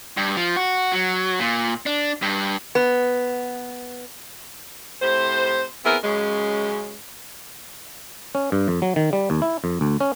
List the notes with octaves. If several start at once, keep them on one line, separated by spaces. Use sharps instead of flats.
G2
F3
F#4
F#3
A#2
D4
G2
B3
A2 C3 C5
B3 C4 E4 G#4 A#4
F#2 C#3 G#3
C#4
G2
F2
F#3
D#3
G3
D#2
E4
F2
D2
C#4